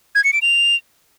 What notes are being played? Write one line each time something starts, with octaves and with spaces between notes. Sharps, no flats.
G#6
C#7
D7
F7